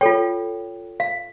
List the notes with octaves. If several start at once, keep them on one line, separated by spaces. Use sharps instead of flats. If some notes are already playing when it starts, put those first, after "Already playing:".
F4 A4 C#5 G5
F5